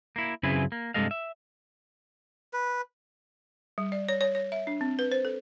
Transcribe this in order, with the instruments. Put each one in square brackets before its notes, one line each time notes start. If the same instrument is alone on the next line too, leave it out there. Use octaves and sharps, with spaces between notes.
[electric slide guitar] A#3 E4
F#2 C#3 C4 E4 G#4 B4
A#3
G2 C3 G#3 A4 D#5 F5
E5
[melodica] B4
[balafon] G3
D5
C#5
C#5
C#5
E5
D4
C4
B4
C5
A4